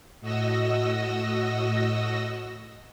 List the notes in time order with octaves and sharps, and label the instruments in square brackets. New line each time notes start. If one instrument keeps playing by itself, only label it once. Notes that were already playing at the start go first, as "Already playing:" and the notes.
[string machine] A2 F#4 D#5 E6 A#6